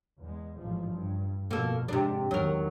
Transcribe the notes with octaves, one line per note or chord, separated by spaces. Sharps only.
E2 G#3
A1 G#2 F3
G2
F2 B2 A#3 A4
G#2 C3 D4
G#1 E2 D#3 F#3 A#4